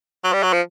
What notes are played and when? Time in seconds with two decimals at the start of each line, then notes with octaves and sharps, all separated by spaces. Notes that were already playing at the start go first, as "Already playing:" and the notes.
0.24 F#3
0.33 G3
0.43 F#3
0.53 F3